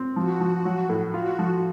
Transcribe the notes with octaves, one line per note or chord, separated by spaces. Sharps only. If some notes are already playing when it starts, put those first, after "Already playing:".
Already playing: C4
F3 F#4
F3
F#3
A2
F4 F#4
F3